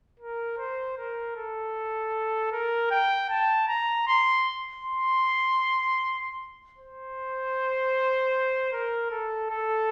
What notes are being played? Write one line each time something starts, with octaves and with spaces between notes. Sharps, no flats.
A#4
C5
A#4
A4
A#4
G5
A5
A#5
C6
C6
C5
A#4
A4
A4